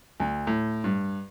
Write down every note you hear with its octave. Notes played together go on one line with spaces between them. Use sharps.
D2
A2
G2